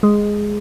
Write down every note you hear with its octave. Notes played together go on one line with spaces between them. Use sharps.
G#3